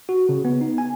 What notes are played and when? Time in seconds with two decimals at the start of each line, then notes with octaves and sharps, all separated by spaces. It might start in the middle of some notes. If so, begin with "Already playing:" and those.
0.09 F#4
0.29 C#3
0.45 B3
0.61 D#4
0.78 G#5